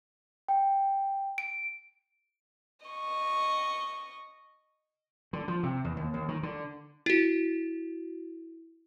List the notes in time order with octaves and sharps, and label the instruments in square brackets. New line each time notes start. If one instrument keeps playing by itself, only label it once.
[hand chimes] G5
D7
[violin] D#5 C#6
[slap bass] D3
F3
C3
E2
D#2
D#2
D#3
D3
[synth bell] E4 F#4